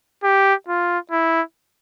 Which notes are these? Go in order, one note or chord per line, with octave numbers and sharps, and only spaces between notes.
G4
F4
E4